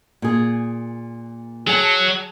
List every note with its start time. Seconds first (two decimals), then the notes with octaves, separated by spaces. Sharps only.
0.22 A#2 G#4
1.67 F#3 G#4 G#5 A5